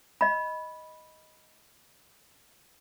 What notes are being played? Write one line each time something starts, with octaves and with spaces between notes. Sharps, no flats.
D#5 B5